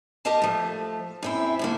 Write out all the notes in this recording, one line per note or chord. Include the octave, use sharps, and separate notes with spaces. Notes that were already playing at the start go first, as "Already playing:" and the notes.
G4 A#4 D#5 F5 A5
F3 A3
F#2 C4 E4
A2 D3 A#3